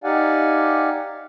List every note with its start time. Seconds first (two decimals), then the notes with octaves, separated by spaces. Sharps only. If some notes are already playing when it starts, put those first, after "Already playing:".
0.04 D#4 G4 D5 F5 F#5 G#5